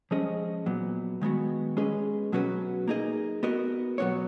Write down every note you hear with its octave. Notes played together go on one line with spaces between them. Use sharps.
F3 G#3 C#4 G#4 D#5
A#2 F#3 B3
D#3 G#3 B3 F#4
G#3 C#4 G#4 B4 D#5
B2 F#3 C#4 F#4 B4
A#3 D#4 G#4 D#5
B3 F#4 A#4 D#5
B2 F#3 B3 F#4 C#5